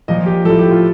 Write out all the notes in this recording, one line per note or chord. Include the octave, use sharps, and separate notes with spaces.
A#2 F3 D#5
G4
A2 F3 A4
G4
F4